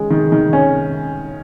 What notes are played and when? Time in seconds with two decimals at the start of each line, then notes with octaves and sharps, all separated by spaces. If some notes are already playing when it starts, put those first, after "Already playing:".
Already playing: D#3 G#3 C#4
0.10 D#3
0.32 D#3
0.53 C#4